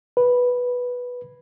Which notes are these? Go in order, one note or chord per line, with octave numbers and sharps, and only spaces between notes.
B4